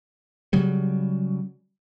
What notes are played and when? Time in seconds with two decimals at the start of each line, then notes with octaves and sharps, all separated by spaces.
0.53 C#3 F#3 G3